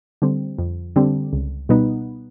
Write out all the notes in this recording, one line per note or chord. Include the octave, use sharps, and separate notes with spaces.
D3 G3 C4
F2
D3 G3 C4
C#2
B2 G3 B3 D#4